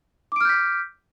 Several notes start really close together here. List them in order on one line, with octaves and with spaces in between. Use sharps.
D6 D7 F6 G6 B6